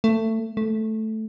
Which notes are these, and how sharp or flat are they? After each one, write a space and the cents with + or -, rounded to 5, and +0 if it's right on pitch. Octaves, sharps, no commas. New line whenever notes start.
A3 +20
A3 -5